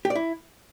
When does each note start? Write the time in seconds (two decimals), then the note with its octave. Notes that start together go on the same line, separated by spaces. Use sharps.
0.05 G4
0.10 D5
0.15 E4